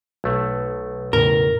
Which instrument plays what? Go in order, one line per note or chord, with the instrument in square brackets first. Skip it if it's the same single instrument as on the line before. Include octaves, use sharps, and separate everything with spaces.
[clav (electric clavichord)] B1 A3
[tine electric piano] E2 A2 C#3 [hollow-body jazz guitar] A#4